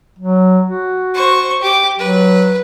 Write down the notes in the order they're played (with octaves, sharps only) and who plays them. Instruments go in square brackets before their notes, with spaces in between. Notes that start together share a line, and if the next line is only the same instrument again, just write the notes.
[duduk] F#3
F#4
[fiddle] C5 C#6
G4 D6
[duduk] F#3 [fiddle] B4